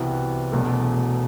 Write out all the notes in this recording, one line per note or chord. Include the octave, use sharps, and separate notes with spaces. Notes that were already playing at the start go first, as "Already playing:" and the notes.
Already playing: C2 C3 E3 B3 F#4
E1 E2 B2 F#3 A3